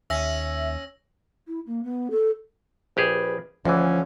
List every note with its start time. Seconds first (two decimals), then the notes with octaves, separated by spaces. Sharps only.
0.10 D#2 C#4 E5 E6 A#6
1.47 E4
1.66 A#3
1.83 B3
2.10 A4
2.97 A#1 G4 G#4 B4
3.65 D2 E3 F3 C#4